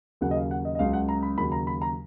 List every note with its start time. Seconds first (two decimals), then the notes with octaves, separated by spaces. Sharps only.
0.21 D#2 C#3 F#3 F#5
0.31 D#5
0.36 F5
0.51 F#5
0.65 D#5
0.75 D#5
0.79 C#2 C#3 F#3 F5
0.93 F#5
1.09 A#5
1.23 B5
1.37 D#2 C#3 F#3 B5
1.52 A#5
1.67 B5
1.82 A#5